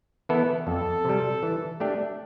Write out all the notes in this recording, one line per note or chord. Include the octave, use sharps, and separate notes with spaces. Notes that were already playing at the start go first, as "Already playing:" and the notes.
E3 B3 E4 A4
F2 A4
C3 G3
E3
A3 D4 G4